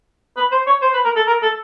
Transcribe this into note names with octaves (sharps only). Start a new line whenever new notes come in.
B4
C5
C#5
C5
B4
A#4
A4
A#4
A4